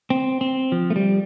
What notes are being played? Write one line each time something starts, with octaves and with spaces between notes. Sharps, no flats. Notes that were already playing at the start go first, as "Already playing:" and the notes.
C4
C4
F3
A3
G3